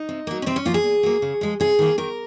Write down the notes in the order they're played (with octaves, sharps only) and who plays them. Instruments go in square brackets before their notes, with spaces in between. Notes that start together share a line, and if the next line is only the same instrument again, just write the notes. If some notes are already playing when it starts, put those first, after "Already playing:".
Already playing: [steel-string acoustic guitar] D#4
C3
F#3 A#3
C#4
C3 C4
C#4
F3 A#3 F4
G#4
A#2
F#3 A#3
C#3
F3 G#3
C3 G#4
D#3 A#3
D#3 A#4